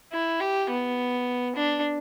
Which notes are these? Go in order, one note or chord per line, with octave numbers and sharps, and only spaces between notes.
E4
G4
B3
D4